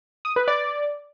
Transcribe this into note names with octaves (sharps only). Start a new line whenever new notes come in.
D#6
B4
D5